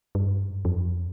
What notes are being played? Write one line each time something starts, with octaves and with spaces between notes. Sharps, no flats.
G2
F2